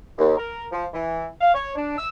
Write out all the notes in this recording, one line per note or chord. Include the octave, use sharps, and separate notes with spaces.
D#2
A#4
F3
E3
F5
C#5
D4
E6